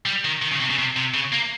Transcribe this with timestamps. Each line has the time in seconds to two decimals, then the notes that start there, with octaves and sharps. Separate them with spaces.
0.05 G3
0.25 D#3
0.42 D#3
0.51 C#3
0.60 C3
0.70 C#3
0.79 C3
0.96 C3
1.14 C#3
1.32 A#3